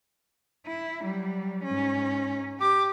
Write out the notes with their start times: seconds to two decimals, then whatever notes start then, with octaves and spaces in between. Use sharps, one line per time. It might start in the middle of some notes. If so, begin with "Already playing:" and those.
0.66 E4
1.02 F#3 G3
1.64 G#2 C#4
2.60 G4 D6